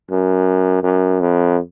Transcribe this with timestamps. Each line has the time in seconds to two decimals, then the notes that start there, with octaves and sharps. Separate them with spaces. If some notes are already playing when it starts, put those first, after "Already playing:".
0.11 F#2
0.83 F#2
1.20 F2